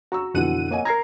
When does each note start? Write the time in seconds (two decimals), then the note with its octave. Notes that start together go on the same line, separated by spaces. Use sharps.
0.12 F#4 A#5 C#6 E6
0.34 F2 B2 D3 E3 F#5 D#7
0.71 A#3 C#5 D#5 G#5
0.85 A#4 A#5 G#6 A#6 C7